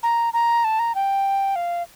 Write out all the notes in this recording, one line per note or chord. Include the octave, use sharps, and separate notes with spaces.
A#5
A#5
A5
A#5
G5
F5